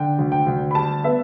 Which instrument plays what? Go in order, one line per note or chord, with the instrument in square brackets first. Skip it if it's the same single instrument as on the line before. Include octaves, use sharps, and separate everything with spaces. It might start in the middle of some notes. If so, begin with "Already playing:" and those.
Already playing: [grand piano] D3 G5
D2
G5
D2
B5
G3 A5
B3 E5